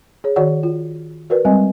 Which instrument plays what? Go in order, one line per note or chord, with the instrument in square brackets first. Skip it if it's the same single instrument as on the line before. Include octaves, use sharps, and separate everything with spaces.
[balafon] G#4 C#5
D#3 F#4 C#5 D5 F#5
F4
F#4 A#4 B4 D5
G3 G#3 C4 D#5 G#5